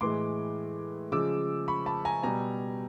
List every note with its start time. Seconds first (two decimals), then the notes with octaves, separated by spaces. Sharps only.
0.01 A2 E3 G#3 C6 D6
1.12 C#3 F3 G#3 D6 E6
1.68 B5 C#6
1.86 A5 B5
2.05 G#5 A#5
2.23 B2 G3 G#5 A#5